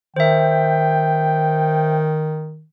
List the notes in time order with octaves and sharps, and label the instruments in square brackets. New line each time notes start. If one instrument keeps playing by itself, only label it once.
[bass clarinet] D#3 [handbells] C5 E5 [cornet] G5